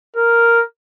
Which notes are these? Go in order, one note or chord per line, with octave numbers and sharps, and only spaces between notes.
A#4